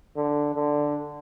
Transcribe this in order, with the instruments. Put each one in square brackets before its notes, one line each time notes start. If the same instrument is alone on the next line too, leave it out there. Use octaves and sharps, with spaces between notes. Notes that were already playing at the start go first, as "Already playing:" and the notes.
[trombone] D3
D3